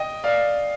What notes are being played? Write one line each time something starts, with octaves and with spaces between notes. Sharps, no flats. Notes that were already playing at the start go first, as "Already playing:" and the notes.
Already playing: D#5 G5
D5 F5